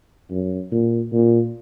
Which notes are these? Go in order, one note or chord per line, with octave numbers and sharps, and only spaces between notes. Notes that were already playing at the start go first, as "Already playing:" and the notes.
F#2
A#2
A#2